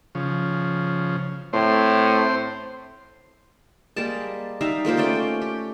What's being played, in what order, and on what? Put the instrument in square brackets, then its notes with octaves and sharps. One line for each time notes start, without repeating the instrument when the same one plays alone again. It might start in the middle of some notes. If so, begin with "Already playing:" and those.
[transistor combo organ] C#3 F3
[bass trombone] A2 [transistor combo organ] C4 C5
[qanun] G3 G#3 A#3 A5
G3 D#4 E5 F5
G#3 A#3 F4 C5
A3 C#4 D5 G5
G5
G4